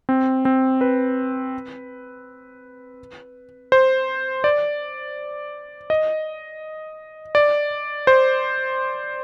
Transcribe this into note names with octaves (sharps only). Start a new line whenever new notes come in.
C4
C4
B4
C5
D5
D#5
D5
C5